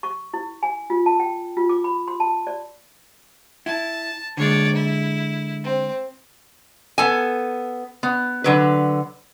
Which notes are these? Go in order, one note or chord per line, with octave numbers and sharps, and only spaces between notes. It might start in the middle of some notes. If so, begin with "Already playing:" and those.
C#6
E4
G#5
F4
A5
G5
F4
D6
B5
C6
A5
D5
E4 A5
D3 G#3 C#5 D5
E4
C4
B3 A4 G#5
B3
D3 F#3 B4